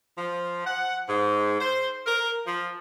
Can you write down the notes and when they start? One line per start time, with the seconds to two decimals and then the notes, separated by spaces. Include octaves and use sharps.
0.18 F3
0.66 F#5
1.09 G#2
1.60 C5
2.07 A#4
2.46 F3